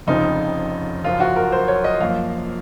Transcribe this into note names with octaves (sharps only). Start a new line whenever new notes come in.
F1 F2 C#3 F3 C4 D#4
F#1 F#2 F3 F4
F#4
A#4
C5
C#5
D#5
F#2 F3 A#3 F5